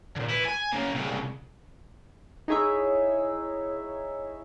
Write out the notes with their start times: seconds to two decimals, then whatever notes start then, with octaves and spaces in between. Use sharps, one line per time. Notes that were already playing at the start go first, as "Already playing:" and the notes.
0.16 A#2 D3
0.30 E4 B4
0.45 G#5
0.72 C#3 A#3
0.94 C2 C#3
2.48 D#4 E4 G#4 C#5 E5